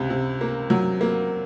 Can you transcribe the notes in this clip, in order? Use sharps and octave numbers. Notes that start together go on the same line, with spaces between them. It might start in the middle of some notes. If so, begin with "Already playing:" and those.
Already playing: C#2 C3
C3
A#3
F#3
A#3